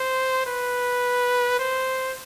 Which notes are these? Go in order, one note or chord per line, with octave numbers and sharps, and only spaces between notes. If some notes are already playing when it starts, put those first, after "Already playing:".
Already playing: C5
B4
C5